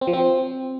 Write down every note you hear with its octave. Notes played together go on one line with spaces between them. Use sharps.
C4
F3
C4